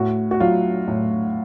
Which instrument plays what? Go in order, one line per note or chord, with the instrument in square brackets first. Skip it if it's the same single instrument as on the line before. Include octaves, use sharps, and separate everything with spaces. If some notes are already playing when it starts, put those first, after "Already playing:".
Already playing: [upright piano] A2 F#4
F#4
F#3 F4
A2